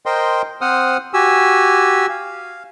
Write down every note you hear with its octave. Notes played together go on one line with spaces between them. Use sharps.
A#4 C5 D#5 G5 C6
C4 C5 F#5 D#6 F6
F#4 G4 G#5 E6
F5